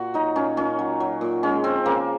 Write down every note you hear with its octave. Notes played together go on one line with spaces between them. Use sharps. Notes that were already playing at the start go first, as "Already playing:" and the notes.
Already playing: A#2 F#4
F#3 D#4
A#2 C#4
A#2 C#4
F#3
F#3
A#2
G#3 C#4
F3 C4
C#3 A#3